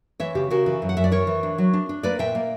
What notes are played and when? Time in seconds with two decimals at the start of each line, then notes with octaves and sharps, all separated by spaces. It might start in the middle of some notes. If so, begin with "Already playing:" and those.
0.20 E3 C#5 E5
0.35 C#3 G4
0.50 C#3 F#4 A#4
0.66 E3
0.82 F#2
0.89 F#5
0.97 F#2 E5
1.04 D5
1.11 E3 A#4 C#5
1.27 E3
1.43 D4
1.58 F#3
1.73 D4
1.89 D4
2.03 A#3 B4 D5
2.19 A#2 E5 G5
2.35 A#3